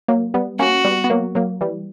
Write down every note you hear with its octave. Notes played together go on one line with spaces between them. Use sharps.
F#3 A#3
G3 B3
A#3 C#4 F#4
G3 B3
B3
F#3 A#3
F#3 A#3
E3 G3